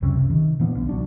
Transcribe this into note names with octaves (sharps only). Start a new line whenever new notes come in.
C#2 F#2 C3 C#4
C3
D#3
A#2 E3 B3 D4
B1
C2 F#3 D4